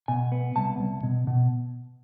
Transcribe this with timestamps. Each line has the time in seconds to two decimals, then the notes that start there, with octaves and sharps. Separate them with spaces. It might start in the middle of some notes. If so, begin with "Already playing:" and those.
0.08 B2 G#5
0.32 B3
0.56 C2 A5
0.80 C2
1.03 B2
1.27 B2